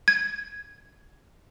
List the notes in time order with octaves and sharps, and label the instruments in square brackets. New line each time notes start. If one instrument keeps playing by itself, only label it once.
[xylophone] G#6